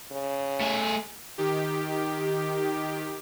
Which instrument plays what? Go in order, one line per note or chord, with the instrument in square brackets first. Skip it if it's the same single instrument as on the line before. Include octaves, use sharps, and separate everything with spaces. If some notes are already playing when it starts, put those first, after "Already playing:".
[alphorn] C#3
[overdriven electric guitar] A3 G#4
[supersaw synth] D#3 G4